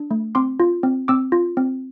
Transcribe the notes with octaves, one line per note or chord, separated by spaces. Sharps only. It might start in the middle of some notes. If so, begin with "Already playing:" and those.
Already playing: D4
A3
C4 C6 D6
F4
C4
C4 D6 E6
F4
C4